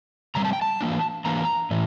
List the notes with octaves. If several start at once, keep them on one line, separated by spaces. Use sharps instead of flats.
C3 G3 C4 A#5
A5
G5
A5
E3 A#3 D4
E3 A#3 D4 A#5
A2 E3